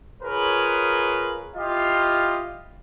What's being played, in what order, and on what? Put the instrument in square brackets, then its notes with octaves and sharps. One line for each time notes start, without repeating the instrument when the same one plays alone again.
[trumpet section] F4 G#4 A#4 B4 C#5
E4 F4 G4 D#5 F5